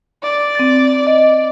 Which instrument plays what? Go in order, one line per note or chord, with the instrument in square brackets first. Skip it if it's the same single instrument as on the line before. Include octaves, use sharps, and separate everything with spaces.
[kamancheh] D5
[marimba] C4 A6
D#5